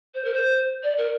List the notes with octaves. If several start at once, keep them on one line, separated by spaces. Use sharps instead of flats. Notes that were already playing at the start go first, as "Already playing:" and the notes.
C5
A#4
C5
D5
A#4